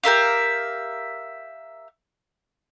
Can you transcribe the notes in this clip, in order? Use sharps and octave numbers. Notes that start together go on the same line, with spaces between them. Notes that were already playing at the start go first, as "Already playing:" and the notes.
G4 A#4 E5 F5